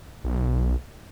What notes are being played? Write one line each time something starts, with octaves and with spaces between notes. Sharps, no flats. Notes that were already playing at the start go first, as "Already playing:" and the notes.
B1